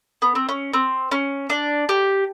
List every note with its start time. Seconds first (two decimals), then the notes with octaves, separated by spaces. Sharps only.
0.22 B3
0.35 C4
0.49 C#4
0.74 C4
1.11 C#4
1.50 D4
1.89 G4